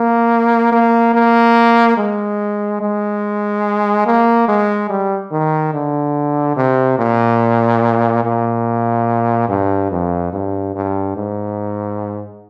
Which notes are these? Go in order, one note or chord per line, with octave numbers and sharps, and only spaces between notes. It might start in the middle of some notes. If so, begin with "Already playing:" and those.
Already playing: A#3
A#3
A#3
G#3
G#3
A#3
G#3
G3
D#3
D3
C3
A#2
A#2
G2
F2
G2
G2
G#2